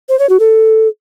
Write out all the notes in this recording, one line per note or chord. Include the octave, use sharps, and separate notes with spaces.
C5
C#5
F#4
A4